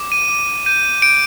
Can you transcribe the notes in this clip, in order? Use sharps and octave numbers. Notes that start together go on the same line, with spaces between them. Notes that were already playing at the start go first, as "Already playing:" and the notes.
Already playing: D6
D#7
D6
G6 D#7
G6 D7